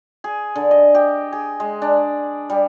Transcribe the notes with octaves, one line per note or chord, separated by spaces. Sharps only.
G#4
D3
D#5
G4
G#4
G#3
D4
G3